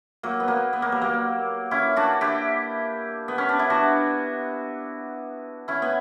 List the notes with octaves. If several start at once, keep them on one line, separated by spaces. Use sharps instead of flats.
F#3 A#3
B3
F#3 A#3
B3
A#3
G3
F#3 A#3
C#4 E4
D4 F#4
E4 G4
B3
C#4
D4
E4
D4 F#4
C#4 E4
B3